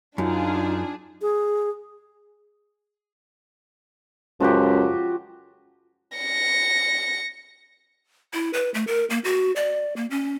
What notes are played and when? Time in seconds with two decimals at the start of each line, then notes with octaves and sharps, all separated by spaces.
0.18 F#2 D4 D#4 F4 G#4
1.22 G#4
4.40 C#2 F#2 F3 F#4 G4
6.18 A#6 C#7
8.33 E4
8.53 B4
8.74 A3
8.87 A#4
9.10 A#3
9.24 F#4
9.56 D5
9.96 A#3
10.10 C#4